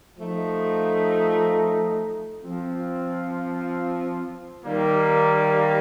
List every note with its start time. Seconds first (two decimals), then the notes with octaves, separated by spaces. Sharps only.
0.18 F3 A3 D#4
2.42 F3 C4 F4
4.65 D#3 G3 A#3